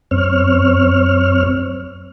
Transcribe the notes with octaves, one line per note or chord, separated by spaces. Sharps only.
F#2 C4 C#5 F6